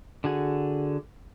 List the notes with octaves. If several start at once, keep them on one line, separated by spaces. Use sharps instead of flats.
D3 F#4 G#4